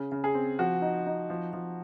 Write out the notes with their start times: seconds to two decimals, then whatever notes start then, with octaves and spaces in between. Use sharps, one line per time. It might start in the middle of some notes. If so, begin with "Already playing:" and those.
Already playing: C#3
0.12 C#3
0.24 G#4
0.34 C4
0.59 F3 F#4
0.82 D#4
1.06 D#4
1.30 F3
1.53 F3